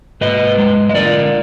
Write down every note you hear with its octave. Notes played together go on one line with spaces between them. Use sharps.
G#2 B4 D#5
G#3
D#5
D3 A#4 D5